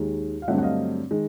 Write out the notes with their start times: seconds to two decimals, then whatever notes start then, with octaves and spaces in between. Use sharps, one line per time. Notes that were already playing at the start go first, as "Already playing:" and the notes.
Already playing: D#2 D#3 G#3
0.42 F5
0.48 G2 D3 F#3 A3 C4 E5 F#5
0.58 F#5
0.63 D#5 F5
1.11 D#3 G#3